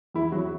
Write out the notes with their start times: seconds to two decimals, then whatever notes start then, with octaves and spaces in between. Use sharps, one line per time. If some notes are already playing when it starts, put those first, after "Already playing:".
0.14 E2 E4
0.32 E2 F#3 F#4